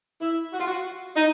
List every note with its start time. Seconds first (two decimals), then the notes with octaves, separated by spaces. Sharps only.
0.22 E4
0.53 F#4
0.60 F4
0.68 F#4
1.16 D#4